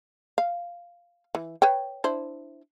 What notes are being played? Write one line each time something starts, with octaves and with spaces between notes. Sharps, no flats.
F5
E3
B4 C#5 G5
D4 E4 C5